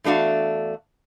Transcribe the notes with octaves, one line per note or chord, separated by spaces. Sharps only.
E2 A3 D4 F#4 F5